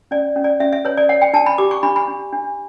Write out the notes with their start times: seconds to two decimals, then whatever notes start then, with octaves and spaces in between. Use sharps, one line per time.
0.11 C#4 D5
0.36 C#4
0.44 D5
0.60 C#4 E5
0.73 E5
0.85 B4 C#5
0.97 D5
1.09 C#5 F#5
1.22 G5
1.33 D4 A5
1.46 B5
1.58 G4 D6
1.71 C#6
1.83 D4 B5
1.96 B5
2.08 D4
2.32 D4